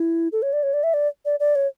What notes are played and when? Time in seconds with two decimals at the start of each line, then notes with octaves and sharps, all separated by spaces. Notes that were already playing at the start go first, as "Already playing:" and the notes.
Already playing: E4
0.32 A4
0.42 C#5
0.53 D5
0.63 C#5
0.73 D5
0.83 E5
0.94 D5
1.25 D5
1.40 D5
1.55 C#5